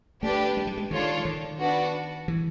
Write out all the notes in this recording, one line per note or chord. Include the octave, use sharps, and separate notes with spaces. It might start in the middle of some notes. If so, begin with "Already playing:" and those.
A3 D4 G4 B4
G#3
G3
G#3
D#3 D4 F4 A4 C#5
D#3
B3 D4 F#4 B4
E3